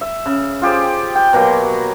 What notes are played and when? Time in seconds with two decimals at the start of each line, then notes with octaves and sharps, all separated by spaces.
0.01 E5
0.26 C#3
0.62 F4 G4 G#4 C5
1.15 G5
1.33 B2 F#3 A#3 G4